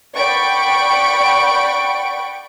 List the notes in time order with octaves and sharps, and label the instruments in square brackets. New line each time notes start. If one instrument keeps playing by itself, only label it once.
[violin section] D5 F#5 G5 B5 C#6 D7